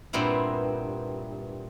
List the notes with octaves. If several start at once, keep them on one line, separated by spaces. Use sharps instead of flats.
G2 A#2 B3 C4 E4